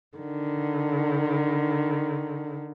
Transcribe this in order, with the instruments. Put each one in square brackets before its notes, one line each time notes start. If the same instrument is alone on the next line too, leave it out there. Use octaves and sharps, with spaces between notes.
[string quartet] D3 D#3